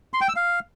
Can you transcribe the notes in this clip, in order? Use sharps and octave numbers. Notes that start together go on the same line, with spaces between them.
C6
G5
E6
F5